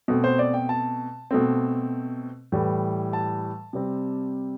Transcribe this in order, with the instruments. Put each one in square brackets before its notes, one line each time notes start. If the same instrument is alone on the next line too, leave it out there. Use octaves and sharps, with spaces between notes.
[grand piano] B2 A3 C4
C5
D5
G5
A5
B2 A3 C4
A2 E3 G3
A5
C3 G3 C4